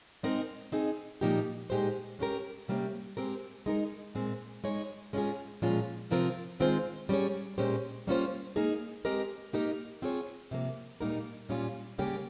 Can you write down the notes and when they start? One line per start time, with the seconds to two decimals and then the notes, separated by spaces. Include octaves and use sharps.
0.23 G#3 C4 D#4 A#4 D#5
0.72 C4 D#4 G#4
1.21 A#2 F3 A#3 D#4 G4
1.70 A#2 G#3 D#4 G4 C5
2.19 G#3 C#4 G4 A#4
2.68 C3 G3 A#3 C#4 G4
3.17 G#3 C4 G4 A#4
3.66 G#3 D#4 A#4
4.15 A#2 G#3 C4
4.64 G#3 D#4 G#4 C#5
5.13 G#3 C#4 F4 G#4
5.62 A#2 F3 G#3 C#4 F4
6.11 C3 F3 C4 F4 A#4
6.60 D#3 G#3 C4 F4 C5
7.09 G3 C#4 G#4 C#5
7.58 A#2 G#3 C#4 G4 C5
8.07 G3 A#3 C#4 F4 C5
8.56 A#3 D#4 G#4
9.05 G#3 C4 G4 A#4 D#5
9.53 A#3 D#4 G4 A#4 D#5
10.02 C4 F4 G#4 C#5
10.51 C3 F3 A#3
11.01 A#2 G3 A#3 D#4 A#4
11.49 A#2 G3 C#4 F4
11.98 C#3 G3 A#3 C#4 G4